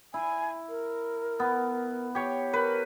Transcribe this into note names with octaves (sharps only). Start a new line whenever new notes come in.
E4 G#5
A#4
B3
G4 C#5
A#4 B4